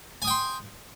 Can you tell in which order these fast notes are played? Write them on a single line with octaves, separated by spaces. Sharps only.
G#5 D#6 G5 C6